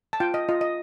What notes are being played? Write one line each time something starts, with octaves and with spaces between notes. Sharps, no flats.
A5
F4 G5
D#5
F4 D#5
D#5